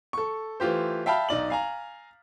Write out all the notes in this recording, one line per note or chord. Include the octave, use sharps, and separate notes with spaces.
A4 C#6
E3 A3 F4 G4 C5
E5 F5 G5 A5 B5 F6
B1 D#4 D5 F#7
F5 G#5 A#5